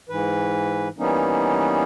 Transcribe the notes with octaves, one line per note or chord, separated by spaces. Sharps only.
G#2 E3 B4
E3 G3 A#3 B3 C#4 D#4